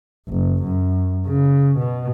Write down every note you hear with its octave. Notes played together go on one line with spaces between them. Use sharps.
F#1
F#2
C#3
B2